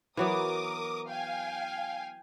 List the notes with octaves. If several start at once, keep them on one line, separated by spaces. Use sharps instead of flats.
E3 F#3 B3 A#4 D6 D#6
F5 G5 G#5